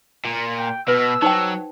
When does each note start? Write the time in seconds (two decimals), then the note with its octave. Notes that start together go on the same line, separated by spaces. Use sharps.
0.25 A#2
0.58 G5
0.88 B2 B4 E6
1.22 F#3 D#4 C5 G5